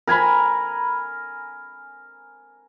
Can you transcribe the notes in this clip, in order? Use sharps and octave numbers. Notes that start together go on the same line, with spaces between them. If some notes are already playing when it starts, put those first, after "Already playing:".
A#4 G#5 A#5 B5